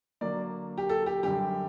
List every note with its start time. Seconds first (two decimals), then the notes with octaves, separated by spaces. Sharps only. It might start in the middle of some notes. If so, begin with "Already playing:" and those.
0.21 D3 F#3 A#3 D5
0.78 G4
0.89 A4
1.06 G4
1.23 F#2 D3 G3 G4